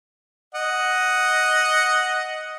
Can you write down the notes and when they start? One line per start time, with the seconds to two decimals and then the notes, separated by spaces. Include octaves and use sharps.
0.55 D#5 F#5